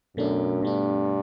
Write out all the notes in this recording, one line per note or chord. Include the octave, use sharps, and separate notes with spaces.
F#2 B2 A3 D4
G2 B2 A3 D4